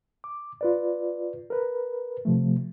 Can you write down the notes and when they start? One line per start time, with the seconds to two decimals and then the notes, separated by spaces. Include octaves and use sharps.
0.24 D6
0.61 F4 B4 D5
1.50 A#4 B4
2.25 C3 F3 A3